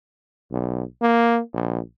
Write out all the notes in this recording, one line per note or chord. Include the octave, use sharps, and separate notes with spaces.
B1
A#3
A#1